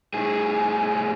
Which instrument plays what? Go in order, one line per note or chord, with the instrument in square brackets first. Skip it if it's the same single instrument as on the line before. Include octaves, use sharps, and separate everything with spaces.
[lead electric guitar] A2 G#4